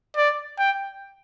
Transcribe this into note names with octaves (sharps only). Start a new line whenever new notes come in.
D5
G5